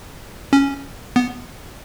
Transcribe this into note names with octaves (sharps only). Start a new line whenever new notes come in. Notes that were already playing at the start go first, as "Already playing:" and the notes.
C#4
B3